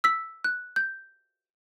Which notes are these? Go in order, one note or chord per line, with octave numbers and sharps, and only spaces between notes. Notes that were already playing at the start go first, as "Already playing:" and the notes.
E6 B6
F#6
G6